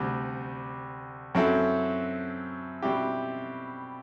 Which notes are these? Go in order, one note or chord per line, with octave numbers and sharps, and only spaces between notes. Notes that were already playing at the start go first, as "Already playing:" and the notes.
Already playing: D2 C3 G3
F#2 F#3 C4 E4 A4
B2 G3 C4 E4 G4